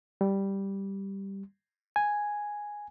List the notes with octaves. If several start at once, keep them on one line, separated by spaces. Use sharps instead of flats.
G3
G#5